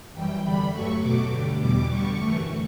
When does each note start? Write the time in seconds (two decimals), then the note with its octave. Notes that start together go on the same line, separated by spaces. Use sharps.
0.13 F#2 E3 G3 G5
0.43 E2 D3 G3 B5
0.72 G2 F#3 A3 C#6
1.01 B2 F#3 A3 D6
1.31 G2 D3 G3
1.60 E2 B2 G3 D6
1.89 G2 D3 G3 C#6
2.18 F#2 E3 A3